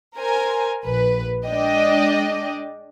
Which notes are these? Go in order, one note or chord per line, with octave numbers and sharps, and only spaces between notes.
A#4 C5 G#5
A#1 B4
G#3 D4 D5 D#5 G5